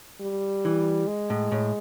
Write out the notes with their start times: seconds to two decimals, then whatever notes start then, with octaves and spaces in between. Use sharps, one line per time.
0.21 G3
0.65 E3
1.07 G#3
1.30 A2
1.52 A2